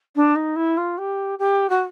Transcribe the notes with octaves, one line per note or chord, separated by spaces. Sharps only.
D4
D#4
E4
F4
G4
G4
F#4